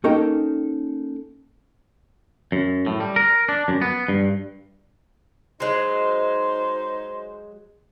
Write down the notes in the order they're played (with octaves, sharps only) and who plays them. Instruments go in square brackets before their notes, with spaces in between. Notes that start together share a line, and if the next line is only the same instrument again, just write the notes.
[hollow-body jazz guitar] A#3 C#4 D#4 A4 A#4 G5
[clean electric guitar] F#2
A2
G3
A#4
D4
F#2
B3
G2
[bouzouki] F#3 G#3 [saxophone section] D#4 C5